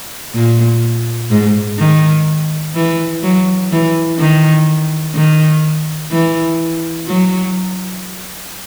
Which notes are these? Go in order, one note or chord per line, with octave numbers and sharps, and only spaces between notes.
A#2
G#2
D#3
E3
F#3
E3
D#3
D#3
E3
F#3